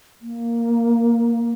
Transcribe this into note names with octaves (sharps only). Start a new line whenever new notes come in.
A#3